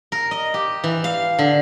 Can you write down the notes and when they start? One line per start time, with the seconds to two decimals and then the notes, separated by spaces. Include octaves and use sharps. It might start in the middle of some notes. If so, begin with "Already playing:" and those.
0.12 A#4
0.31 D#5
0.54 G4
0.84 E3
1.04 F5
1.39 D3